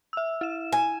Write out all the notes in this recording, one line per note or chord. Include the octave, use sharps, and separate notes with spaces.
E5 E6
E4 E7
G#5